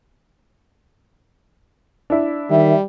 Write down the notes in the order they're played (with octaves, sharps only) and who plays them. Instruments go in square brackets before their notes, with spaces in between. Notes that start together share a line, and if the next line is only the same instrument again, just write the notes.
[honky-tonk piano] D4 E4
[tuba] D#3 [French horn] G3 [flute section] E5